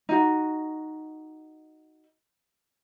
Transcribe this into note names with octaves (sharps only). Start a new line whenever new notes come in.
D#4 F#4